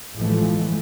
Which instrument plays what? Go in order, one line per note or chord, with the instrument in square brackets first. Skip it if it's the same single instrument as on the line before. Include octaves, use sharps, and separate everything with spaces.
[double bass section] G1 A2 E3 F3 G#3 A3